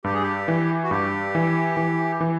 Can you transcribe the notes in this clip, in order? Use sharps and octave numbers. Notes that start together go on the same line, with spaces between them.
G2 G4
G#4
G4
E3
F#4
G2 G4
E3
E3
E3